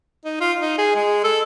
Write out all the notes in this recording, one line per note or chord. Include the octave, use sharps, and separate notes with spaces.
D#4
F4
D#4
G#4
G#3
A4